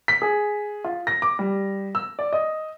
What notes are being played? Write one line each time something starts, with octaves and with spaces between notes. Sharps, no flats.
B6
G#4
F4
A#6
D6
G3
E6
D5
D#5